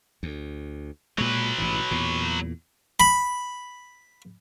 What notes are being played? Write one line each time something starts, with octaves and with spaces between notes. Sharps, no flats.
D2
A#2 F#3 G#3 B4
A1 G#2 E3
E2 A#2
B5